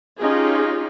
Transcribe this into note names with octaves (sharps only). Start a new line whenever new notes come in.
C#4 D#4 F4 G4 G#4